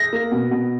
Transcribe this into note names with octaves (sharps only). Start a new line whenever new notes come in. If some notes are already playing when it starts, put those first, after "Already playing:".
Already playing: A#6
A#3
B2
B2